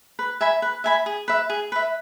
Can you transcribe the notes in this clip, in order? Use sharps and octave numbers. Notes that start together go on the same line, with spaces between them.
B4
E5 G#5 B5
B4
E5 G#5 B5
G#4
B4 E5
G#4
B4 E5